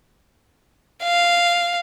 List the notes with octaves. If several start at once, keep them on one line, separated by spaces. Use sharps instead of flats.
F5